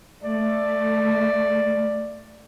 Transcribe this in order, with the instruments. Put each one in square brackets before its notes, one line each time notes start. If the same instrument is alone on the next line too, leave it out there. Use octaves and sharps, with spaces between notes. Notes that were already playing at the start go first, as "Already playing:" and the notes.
[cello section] A3 [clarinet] D5